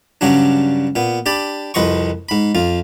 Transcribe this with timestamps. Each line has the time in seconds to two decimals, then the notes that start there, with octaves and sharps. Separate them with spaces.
0.21 G2 C#3 F#3 C#4 D4
0.96 A#2 B3
1.26 D4 G4 A5 B5
1.74 C2 F2 B4 D#5 C6 C#6
2.29 G#2 B5
2.55 F2 F4